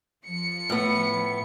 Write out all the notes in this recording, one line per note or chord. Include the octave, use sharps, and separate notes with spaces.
F3 C#7
A2 B3